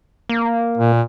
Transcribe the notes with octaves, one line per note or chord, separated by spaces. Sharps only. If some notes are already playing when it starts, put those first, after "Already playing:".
A#3
A#2